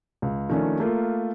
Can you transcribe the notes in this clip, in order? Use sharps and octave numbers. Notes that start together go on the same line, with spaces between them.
C#2
D#3 F3 A3 C#4 D4
A3 A#3 F4